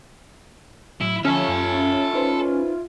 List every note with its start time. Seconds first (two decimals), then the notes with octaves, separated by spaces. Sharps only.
1.00 A2 F#3 E4
1.25 D3 F3 C#4 F4 A4 E5
1.48 F#2
2.14 D#4 B4 C5